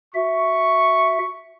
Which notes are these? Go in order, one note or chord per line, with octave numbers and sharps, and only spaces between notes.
F#4 E5 C#6